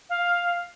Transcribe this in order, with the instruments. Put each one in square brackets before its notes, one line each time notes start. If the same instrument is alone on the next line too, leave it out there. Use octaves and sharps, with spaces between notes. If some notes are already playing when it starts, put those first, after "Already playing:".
[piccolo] F5